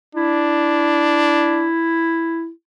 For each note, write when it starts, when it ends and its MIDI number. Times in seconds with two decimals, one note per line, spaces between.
0.15 1.70 62
0.15 2.50 64